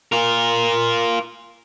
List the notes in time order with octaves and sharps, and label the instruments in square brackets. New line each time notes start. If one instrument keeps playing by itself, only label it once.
[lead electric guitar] F4 A#4